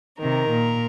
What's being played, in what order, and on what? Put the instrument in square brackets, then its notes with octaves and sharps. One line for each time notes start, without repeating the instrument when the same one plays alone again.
[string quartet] C3 D#3 A#4
A#2